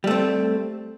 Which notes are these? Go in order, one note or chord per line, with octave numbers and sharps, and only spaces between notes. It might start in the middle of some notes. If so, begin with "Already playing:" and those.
G3 A3 C4